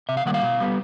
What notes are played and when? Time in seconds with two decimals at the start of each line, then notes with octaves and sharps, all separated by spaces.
0.09 C3 E5
0.17 F5
0.26 D#3 G3 A#3 F#5
0.34 F5
0.43 B2
0.60 G3 B3